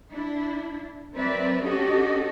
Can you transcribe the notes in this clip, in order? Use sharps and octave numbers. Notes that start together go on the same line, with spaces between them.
D4 E4
F#3 C4 A#4 B4 D5 E5
C#4 D4 F#4 G4 A4 D#5